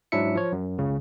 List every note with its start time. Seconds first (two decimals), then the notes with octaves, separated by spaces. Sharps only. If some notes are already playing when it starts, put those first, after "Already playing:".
0.12 G#2 F#3 D4 E4 E5 C#7
0.35 F3 C#5
0.52 F#2
0.79 C#2 C#3